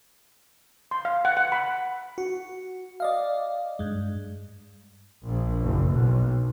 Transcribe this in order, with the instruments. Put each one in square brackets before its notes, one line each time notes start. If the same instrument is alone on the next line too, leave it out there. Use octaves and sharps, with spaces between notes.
[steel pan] C6
F5
F#5
F#5
B5
[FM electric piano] F#4
D5 D#5 F5
G2 G#3
[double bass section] A#1
F#1
B1